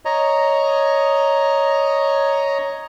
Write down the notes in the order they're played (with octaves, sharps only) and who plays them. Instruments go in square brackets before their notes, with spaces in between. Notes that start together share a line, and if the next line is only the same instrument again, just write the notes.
[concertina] C#5 D#5 A#5